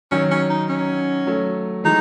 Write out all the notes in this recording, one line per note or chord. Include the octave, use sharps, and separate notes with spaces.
D#3 F#3 C#4
C#4
D#4
C#4
F#3 A3
E3 G#3 D#4